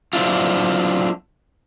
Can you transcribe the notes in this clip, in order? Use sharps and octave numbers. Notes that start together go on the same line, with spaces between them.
F#3 C4 D4 E4 F4